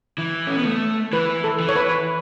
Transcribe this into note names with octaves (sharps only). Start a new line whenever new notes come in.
E3
C#4
B3
A3
E3 B4
A4
E3
C#5
B4